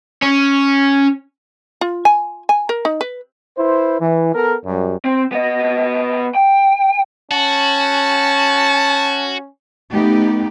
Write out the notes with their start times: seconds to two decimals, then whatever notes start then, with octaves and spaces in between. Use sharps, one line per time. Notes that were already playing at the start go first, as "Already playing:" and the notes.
0.22 C#4
1.81 F4
2.05 G#5
2.49 G#5
2.69 A#4
2.85 D#4
3.01 B4
3.56 E4 B4 C5
3.99 E3
4.33 B3 A4 A#4
4.65 F#2 G3
5.04 C4
5.32 B3 D#5
6.35 G5
7.31 C#4 F#4 A5
9.91 A3 B3 D#4 G4